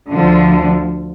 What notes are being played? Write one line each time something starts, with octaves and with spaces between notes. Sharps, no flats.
D2 D3 F3